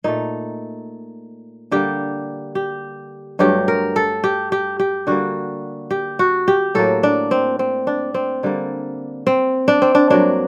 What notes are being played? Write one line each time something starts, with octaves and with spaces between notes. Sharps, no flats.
A#2 A3 D#4
D3 G3 A#3 G4
G4
G2 F#3 A3 G4
A#4
A4
G4
G4
G4
D3 G3 A#3 F#4
G4
F#4
G4
A2 F#3 A#3 A4
D4
C4
C4
D4
C4
D3 G3 A#3
C4
D4
C4
D4
G2 F#3 A#3 D4